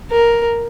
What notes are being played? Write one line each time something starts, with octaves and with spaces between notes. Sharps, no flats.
A#4